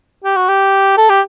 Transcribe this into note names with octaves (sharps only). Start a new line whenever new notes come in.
G4
F#4
G4
A4
G4